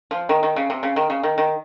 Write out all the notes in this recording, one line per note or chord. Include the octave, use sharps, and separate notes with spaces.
F3
D#3
D#3
C#3
C3
C#3
D#3
C#3
D#3
D#3